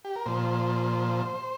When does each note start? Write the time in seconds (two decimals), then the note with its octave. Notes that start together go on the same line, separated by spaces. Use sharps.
0.05 G4
0.16 A#4
0.26 A#2 F3 C5